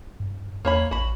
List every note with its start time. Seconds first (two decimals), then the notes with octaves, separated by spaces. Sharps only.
0.20 G2
0.65 E2 A#3 C#5 B5
0.91 A1 F#4 B5